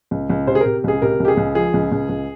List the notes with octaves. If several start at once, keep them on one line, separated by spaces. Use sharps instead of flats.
C#2
C#2
C3 C5
G#4
A#4
C3
C#2 G#4
C3 A#4
C#2 G4
G#4
C#2
F3 G#4
C#2
C#2
C#2